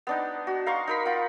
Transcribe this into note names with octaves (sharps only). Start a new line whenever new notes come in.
B3 D4 D#4
F#4
F5 A#5 C6 C#6
D#4 A#4 B5
F4 F#5